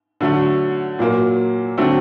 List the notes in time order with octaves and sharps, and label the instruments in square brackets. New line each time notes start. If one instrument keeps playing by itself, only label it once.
[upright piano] D3 F#3 A3
A#2 F#3 A#3
D3 F#3 A3 C4